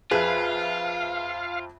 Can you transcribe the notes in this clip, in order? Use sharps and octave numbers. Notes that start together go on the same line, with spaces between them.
F2 F4 G#4 B4 E5 F5 F#6